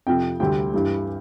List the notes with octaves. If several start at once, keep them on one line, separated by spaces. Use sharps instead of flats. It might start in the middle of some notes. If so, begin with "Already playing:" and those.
F2 C3 F3 G5
D2 C3 G3 C4 G5
G2 E3 G3